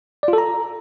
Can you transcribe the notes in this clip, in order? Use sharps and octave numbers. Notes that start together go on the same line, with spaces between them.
D5
F4
A4
A#5